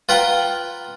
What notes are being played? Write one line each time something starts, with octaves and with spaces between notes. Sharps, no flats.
F4 B4 F#5 G5 A#5